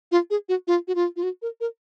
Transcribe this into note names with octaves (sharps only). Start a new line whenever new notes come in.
F4
G#4
F#4
F4
F#4
F4
F4
F#4
A#4
A#4